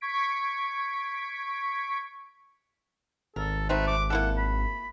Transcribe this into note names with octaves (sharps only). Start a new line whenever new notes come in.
C#6 G#6 B6 D7
G#1 A4 A#4
A3 C4 D#4 B4
D6
A#3 E4 A4 F#5
B5